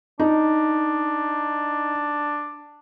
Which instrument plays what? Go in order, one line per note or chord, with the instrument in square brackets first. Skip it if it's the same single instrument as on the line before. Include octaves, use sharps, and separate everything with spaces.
[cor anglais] D4 [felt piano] D#4